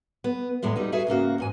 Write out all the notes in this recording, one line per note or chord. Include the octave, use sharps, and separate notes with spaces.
B3
E2 A2 G#3 B3
G3 D#4 F#4
F#4 G#4 A4 B4 E5
G#2 C#3 A#3 F#4
E2 G#2 G#5